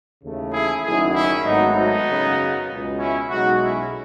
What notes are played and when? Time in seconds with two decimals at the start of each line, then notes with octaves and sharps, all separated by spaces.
0.21 D#2 C#3 E3 A3
0.52 E4 G#4
0.83 F#1 F#2 D#3 F#3 A3 E4 G#4
1.14 C#4 E4
1.45 G#1 G#2 F#3 A3 B3 D#4
1.75 B3 D#4
2.07 F#2 C#3 F#3
2.69 C#2 B2 G#3
2.99 C#4 E4
3.30 B1 B2 G#3 D#4 F#4
3.61 C#4 E4